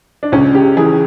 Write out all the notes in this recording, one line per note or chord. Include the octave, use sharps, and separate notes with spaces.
D4
C#2 C#4
C#3 G4
E3 G#4